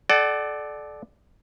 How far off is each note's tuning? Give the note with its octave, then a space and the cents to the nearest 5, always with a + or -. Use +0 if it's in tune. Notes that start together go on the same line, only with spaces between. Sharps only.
A4 -30 D5 +15 F#5 +35